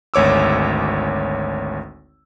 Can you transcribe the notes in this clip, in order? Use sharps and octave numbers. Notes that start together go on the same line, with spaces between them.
G#1 D2 C#5 D6 E6